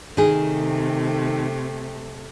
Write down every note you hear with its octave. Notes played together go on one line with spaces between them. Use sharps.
C3 D#3 A3 G#4